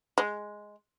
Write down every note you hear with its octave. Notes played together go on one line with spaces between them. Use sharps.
G#3